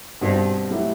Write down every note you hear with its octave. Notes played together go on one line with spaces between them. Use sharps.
G2 B2 G3 C4 D#4 A4
F#3 A3 E4 G4